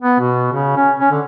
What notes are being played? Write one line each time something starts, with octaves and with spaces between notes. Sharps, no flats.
B3
B2
C#3
C#4
C#4
D3